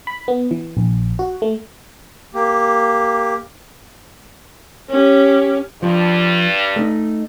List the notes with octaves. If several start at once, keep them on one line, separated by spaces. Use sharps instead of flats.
B5
B3
E3
A#1
F#4
A3
A#3 G4
C#4 G4
G2 F3
A3 D#4